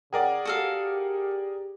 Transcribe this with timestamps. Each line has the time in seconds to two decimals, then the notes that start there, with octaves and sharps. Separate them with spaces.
0.13 C#3 G#4 A#4 D5 F#5 G5
0.45 F#4 G4 A4 F5